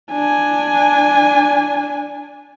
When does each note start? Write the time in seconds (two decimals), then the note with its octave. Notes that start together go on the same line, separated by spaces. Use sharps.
0.13 D4 G#5